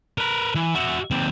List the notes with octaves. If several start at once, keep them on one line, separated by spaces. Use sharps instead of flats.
A#4 B4
E3
F#4 E5
D#2 C4